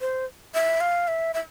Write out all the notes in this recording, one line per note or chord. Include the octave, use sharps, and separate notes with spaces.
C5
E5
F5
E5
E5